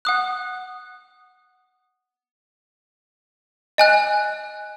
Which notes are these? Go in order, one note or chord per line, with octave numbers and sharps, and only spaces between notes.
F#5 D#6 F#6
D#5 G#5 F#6